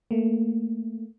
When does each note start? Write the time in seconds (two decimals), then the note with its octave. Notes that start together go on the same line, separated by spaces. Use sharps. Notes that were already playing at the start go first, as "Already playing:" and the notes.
0.11 A3 A#3